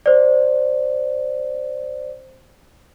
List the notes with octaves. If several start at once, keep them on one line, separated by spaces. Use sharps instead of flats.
C5 D5